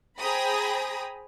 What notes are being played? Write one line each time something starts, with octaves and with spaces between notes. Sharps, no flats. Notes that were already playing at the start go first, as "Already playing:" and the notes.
G#4 C5 G5 A#5 B5 D#6